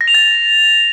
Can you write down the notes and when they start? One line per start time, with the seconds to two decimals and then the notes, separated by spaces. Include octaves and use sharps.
0.01 A#6
0.08 F7
0.14 A6